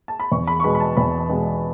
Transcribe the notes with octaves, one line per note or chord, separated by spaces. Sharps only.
A5
B5
E2 C#6
B5
C#6
B2 G#3 B3 B5
B5
A5
E2 B5
B2 G#3 B3